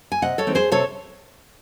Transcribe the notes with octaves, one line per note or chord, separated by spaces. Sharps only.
G#5
C3 D#5 F#5
A4 C#5
E3 G#3 C4 D#4
G#4 C5
C3 A4 C#5